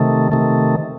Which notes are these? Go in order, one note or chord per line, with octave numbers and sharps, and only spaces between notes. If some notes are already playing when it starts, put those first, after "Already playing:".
Already playing: C3 D#3 A3
C3 D#3 A3